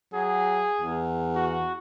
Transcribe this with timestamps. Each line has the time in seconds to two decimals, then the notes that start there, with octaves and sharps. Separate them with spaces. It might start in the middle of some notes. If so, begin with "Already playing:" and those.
0.14 F#3 G#4
0.81 E2
1.35 F#4